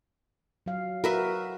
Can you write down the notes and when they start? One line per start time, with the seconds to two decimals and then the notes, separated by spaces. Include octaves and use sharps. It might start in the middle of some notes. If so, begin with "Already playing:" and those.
0.66 F#3 F5
1.04 F#4 A#4 B4 E5